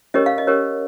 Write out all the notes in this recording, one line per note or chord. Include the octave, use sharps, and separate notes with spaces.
C#4 G4 A#4 C#5 D#5
F5
D#5
C#4 G4 A#4 C#5